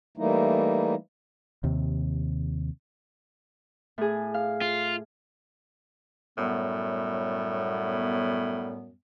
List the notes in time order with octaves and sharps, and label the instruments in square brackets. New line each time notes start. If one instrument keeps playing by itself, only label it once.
[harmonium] E3 G3 A3 A#3 D#4 E4
[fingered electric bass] D#2 C3
[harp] A2 G#4
F5
[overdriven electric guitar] F4
[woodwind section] F#2 G3 B3 [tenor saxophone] A2